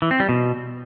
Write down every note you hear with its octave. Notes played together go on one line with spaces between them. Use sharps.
E3
C4
G3
B2